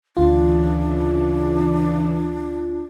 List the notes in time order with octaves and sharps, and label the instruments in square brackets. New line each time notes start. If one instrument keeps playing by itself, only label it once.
[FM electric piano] D2 F4 [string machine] C#3 E3 [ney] D4